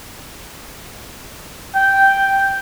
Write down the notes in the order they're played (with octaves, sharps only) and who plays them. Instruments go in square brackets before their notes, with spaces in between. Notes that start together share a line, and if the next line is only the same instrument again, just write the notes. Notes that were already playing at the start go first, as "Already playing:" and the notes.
[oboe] G5